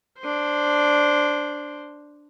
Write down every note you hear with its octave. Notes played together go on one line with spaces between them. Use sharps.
D4 C5